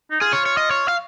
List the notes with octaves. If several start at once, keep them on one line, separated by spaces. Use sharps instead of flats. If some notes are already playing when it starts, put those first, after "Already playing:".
D#4
F4 G#4
C#5
C#5
D#5
C#5
F5